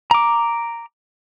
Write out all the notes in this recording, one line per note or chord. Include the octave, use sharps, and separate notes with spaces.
A#5 D6